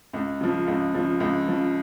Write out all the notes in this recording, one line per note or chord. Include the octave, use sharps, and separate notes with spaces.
C#2
C#3 F3
C#2
C#3 F3
C#2
C#3 F3